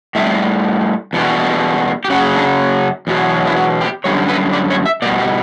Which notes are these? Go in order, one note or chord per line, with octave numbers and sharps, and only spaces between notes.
A2 G3 E5
E2 B2 G3
G4
F#2 C#3 F#3 F#4
D4
E2 B2 F#3
E4
F#4
G4
F#2 D3 G3 C#5
B4
D5
C#5
E5
B2 G3 D5
G4